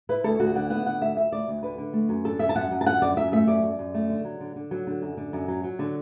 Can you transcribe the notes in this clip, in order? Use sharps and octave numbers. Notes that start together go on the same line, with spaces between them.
E4 B4
D2 A4
D2 F#4
D3 F#5
B3 F#5
D3 F#5
D2 E5
D2 E5
D2 D5
D2
D3 B4
D3
A3
F#2
D3 A4
F#2 E5
A5
F#2 F#5
F#2
A5
D3 F#5
F#2 D5
F#2 E5
A3 E5
F#2 D5
F#2
F#2
A3
D3
F#3
D3
D3
F#3
D3
F#2
D3
F#2
F#3
F#3
D3